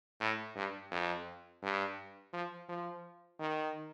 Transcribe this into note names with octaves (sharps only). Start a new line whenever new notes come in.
A2
G2
F2
G2
F3
F3
D#3